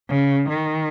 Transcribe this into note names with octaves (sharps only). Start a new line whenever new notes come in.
C#3
D#3